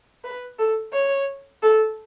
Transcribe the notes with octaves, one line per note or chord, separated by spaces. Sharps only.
B4
A4
C#5
A4